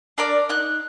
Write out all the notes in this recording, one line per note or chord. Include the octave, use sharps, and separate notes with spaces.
D4 A#4 D5
D#4 F#6